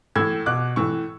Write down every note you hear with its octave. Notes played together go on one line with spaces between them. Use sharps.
A2 E3 E6 G#6
B2 D6 F#6
A2 E3 C#6 E6